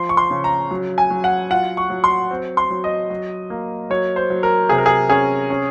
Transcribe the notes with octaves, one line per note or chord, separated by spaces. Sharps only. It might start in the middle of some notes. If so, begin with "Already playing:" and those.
Already playing: F3 C6
C#6
C6
C#3
A#5
F#3
G#5
F#3
F#5
F4 F#5
C#6
F#3
C6
C4
C6
F#3
D#5
F#3
A#3
F#3 C#5
C5
F#3
A#4
C3 G#4
A#4
G#4
C#4 G#4
C#4